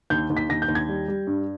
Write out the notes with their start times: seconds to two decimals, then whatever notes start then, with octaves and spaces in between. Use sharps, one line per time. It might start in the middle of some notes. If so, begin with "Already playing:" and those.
0.10 D#2 G6
0.30 D#2
0.37 B6
0.49 D#2 A#6
0.62 G6
0.68 D#2
0.75 G#6
0.88 G3
1.08 G3
1.27 G2